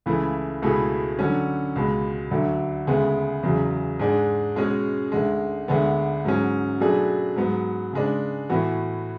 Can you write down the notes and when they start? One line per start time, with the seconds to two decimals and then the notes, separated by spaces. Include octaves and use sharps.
0.06 C#2 C#3 E3 A3 E4
0.62 C#2 B2 A3 E4 G#4
1.19 D3 F#3 C#4 F#4
1.76 C#2 B2 G#3
2.31 D2 D3 F#3
2.87 D2 C#3 G#3 B3
3.43 E2 C#3 F#3
3.99 G#2 G#3 D4 G#4
4.56 B2 G#3 C#4 G#4
5.12 D2 D3 G#3
5.68 D2 D3 G#3 B3
6.25 G#2 F#3 C#4
6.80 B2 F#3 A3 D4 G#4
7.36 G#2 F#3 B3
7.93 C#3 G#3 D4
8.49 A2 E3 B3 F#4